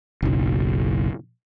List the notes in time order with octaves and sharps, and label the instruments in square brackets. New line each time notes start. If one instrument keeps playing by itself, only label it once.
[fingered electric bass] F#1 B1